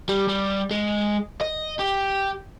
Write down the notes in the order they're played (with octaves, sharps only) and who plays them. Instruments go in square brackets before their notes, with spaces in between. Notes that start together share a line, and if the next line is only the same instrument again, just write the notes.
[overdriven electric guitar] G3
G3
G#3
D#5
G4